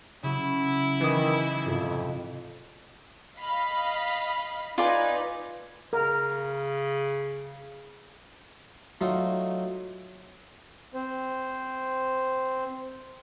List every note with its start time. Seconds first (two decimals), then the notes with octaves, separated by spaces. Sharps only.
0.23 C#3 F#3 E4
1.01 D#3 E3 D#6
1.66 F2 G#2 C3
3.37 D#5 F5 B5
4.78 D#4 F4 B4 D5 G#5
5.93 C#3 A#4
9.01 F#3 A3 D#4 F4
10.94 C4 C5